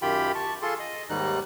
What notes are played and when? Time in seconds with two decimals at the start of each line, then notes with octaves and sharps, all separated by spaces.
0.02 F#2 D#3 F4 G4 G5 B5
0.35 A5 C#6
0.62 F4 G#4 A4 A5 C6
0.79 D#5
1.10 D#2 G#2 D#3 G3 D#4 F#6